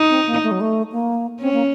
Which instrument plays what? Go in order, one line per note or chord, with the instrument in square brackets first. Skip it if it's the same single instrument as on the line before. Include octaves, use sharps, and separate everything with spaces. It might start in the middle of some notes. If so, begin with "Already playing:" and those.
Already playing: [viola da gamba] D#4
[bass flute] C4
A#3
A3
F#3
A3
A#3
[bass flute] C4 [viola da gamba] C#4
[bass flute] A#3